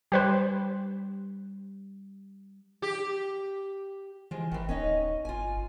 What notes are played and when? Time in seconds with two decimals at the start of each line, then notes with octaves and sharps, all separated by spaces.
0.12 G3 G4 B4 C5
2.82 G4
4.31 E3 F3 G#3
4.52 G1 D#3 E3
4.69 D1 C#4 D#4 D#5
5.25 G1 F4 G#5